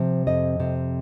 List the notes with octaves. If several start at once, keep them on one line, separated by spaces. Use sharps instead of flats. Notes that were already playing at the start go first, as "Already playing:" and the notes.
Already playing: C3 F3
F2 D#5
C3